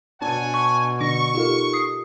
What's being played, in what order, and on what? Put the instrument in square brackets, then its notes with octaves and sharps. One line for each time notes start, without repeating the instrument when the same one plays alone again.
[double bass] B2 [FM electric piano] D4 A5 [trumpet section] C#5 F#5 G#5
[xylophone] C#6
[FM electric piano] D3 D4 [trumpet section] C#6 [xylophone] A#6
[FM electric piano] D#4 F4 [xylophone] G4 A4 A#4
[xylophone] D#6 C7